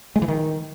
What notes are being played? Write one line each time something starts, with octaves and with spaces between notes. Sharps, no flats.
G#3
E3
D#3